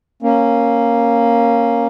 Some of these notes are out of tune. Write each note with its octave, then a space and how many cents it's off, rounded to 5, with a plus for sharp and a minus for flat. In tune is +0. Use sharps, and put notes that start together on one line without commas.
A#3 +0 C#4 -10